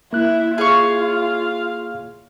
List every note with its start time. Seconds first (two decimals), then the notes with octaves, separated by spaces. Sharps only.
0.13 A#3 E4 F#6
0.58 F4 G#4 C#5 F5 C#6